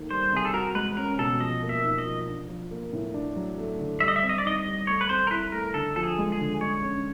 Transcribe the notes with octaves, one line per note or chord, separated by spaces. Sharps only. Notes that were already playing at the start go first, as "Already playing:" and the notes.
Already playing: D#3 A3 A#3
G3 C5
C3 G#4
A4
F#4 A#4
G#3 B4
C#4 A#4
B2 A4
F3 D#5
A#3
E5
D#4
D#5
F3
D4
F3
A#3
A2
D4
F#3
A3
D3
G3 E5
D#5
E5
C4
D#5
D5
D#4 D#5
D#5
G3
A3 C#5
B4
C4 C5
A#4
E4 B4
A3 A#4
D3 A4
F3 A4
G#4
G#3
G#4
D3
G#3 C#5
C#4